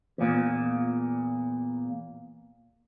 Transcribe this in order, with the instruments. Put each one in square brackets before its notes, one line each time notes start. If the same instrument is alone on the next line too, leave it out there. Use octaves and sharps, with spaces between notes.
[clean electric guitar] E2 A#2